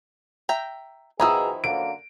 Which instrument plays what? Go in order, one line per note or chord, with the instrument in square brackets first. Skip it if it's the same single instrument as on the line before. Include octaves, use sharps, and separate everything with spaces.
[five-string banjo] E5 G5 A#5
[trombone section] B2 G#4 [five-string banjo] D#3 F3 E4 [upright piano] A#5 D#6 E6
[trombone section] F#2 D3 A#3 [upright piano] D7